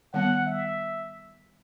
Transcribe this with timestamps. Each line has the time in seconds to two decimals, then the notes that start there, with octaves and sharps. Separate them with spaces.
0.13 D#3 G3 B3 F#5
0.46 E5